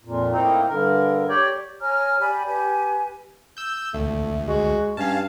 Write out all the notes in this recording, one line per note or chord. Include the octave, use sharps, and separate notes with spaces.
F2 A#2
A2 A#3 C4 D#4
G2 D3 A#4
G4 C#5 D5 G5
C#5 G#5 A#5 F6
G4 D5 G#5 B5
G4 B4 G#5
E6 G6
D2 A3
G#3 F#4
G2 C#4 F5 A5